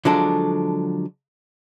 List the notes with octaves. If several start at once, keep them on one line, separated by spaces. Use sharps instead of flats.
D3 F3 F#3 G#3 D4 A4